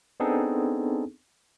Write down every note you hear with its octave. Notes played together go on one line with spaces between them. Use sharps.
B3 C4 D4 D#4 G#4 A4